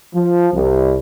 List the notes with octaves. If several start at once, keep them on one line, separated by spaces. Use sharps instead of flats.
F3
C2